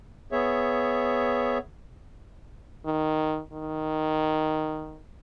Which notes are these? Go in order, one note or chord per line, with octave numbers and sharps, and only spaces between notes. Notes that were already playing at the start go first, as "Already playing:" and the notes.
B3 G#4 C#5 E5
D#3
D#3